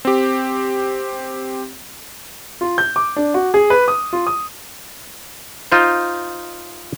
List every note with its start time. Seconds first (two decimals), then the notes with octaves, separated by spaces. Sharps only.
0.05 C4 G4
2.61 F4
2.78 G6
2.96 D6
3.16 D4
3.34 F#4
3.54 G#4
3.70 B4
3.88 D#6
4.13 F4
4.27 D#6
5.72 D#4 F4 C5